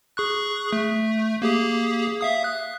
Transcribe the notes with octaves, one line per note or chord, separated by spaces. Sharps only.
G#4 C#6 F#6
A3
A#3 G4 G#4
E5 F5 D#6
F#6